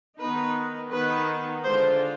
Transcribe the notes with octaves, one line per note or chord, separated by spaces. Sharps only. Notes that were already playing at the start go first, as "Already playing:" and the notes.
D#3 B3 D#4 B4
D#3 B3 D#4 B4
D3 G#3 D4 F4 C5